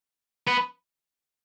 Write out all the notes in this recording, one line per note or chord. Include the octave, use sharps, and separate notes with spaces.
B3